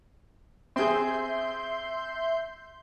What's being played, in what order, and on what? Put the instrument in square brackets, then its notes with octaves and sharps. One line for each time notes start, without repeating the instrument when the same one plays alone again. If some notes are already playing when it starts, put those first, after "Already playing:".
[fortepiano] C4 G#4 [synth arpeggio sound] E5 C6 G6